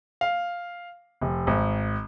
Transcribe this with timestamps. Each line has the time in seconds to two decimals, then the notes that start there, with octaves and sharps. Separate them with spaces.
0.21 F5
1.21 F1
1.47 G#1